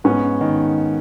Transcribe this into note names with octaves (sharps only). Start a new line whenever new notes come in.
G#2 B3 C#4
D#3